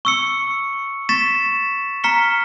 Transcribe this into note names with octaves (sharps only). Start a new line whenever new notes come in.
C#6 E6 C#7
C#6 A6 B6 E7
A#5 F6 B6 C#7 G7